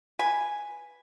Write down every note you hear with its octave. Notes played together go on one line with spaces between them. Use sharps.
B4 G#5